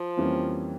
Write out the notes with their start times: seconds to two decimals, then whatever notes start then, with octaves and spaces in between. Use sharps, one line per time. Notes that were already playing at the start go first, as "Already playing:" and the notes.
Already playing: F3
0.17 F2 E3 G3 A#3 C#4